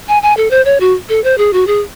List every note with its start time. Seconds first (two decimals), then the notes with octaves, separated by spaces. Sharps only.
0.08 G#5
0.23 G#5
0.37 A4
0.51 C5
0.65 C#5
0.80 F#4
1.09 A4
1.24 C5
1.38 G#4
1.53 F#4
1.67 G#4